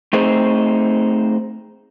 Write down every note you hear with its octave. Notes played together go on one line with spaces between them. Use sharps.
A3 C4 D#4 G#4 C5